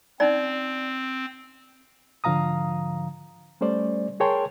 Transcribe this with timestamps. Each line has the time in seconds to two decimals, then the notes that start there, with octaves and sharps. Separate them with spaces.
0.20 C4 C#4 D#4 D5
2.24 G#2 D3 F3 F5 A#5 D#6
3.61 G3 A3 C#4 C5 D5
4.20 G#4 A#4 C#5 G5 A5 C6